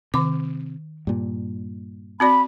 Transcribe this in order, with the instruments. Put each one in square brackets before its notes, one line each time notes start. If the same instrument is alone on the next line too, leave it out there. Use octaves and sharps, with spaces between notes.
[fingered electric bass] C3 [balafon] D#3 D6
[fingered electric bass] G2 A#2
[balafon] C4 F#4 D5 [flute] B5